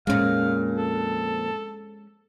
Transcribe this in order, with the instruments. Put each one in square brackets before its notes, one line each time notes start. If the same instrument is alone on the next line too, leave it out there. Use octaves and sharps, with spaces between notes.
[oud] F2 A#2 [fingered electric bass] G#3 C#4 [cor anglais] F5
[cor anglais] A4